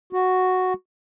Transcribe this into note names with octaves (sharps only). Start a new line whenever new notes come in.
F#4